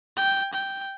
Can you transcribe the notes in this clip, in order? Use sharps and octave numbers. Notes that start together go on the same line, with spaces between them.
G5
G5